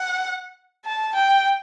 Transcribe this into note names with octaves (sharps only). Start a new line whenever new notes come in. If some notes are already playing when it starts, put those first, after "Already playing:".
Already playing: F#5
A5
G5